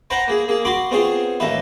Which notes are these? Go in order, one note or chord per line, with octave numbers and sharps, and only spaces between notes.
B4 C5 F#5 G5 A#5
A#3 G#4
A#3 G#4
F#4 B5 C6 D6
B3 C4 F4 G#4 C#5
A1 A#3 D#4 B4 E5